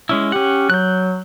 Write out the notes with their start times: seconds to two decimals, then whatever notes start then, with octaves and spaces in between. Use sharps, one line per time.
0.09 G#3 C#4 E4
0.32 C#4 G4 F#5
0.70 F#3 F#6 G6